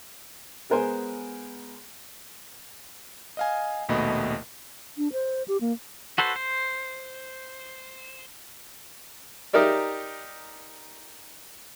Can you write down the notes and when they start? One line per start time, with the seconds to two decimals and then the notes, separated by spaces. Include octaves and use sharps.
0.70 G#3 B3 A#4 C5 G#5
3.37 D#5 F5 G#5
3.89 A#1 D#2 B2 A3 D#5 B5
4.98 D4
5.13 C5
5.48 G4
5.61 A#3
6.18 F#4 A4 B4 C5
6.36 C5
9.53 D#4 G4 A#4 D5 E5